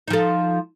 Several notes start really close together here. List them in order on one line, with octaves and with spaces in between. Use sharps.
D#4 F3 A4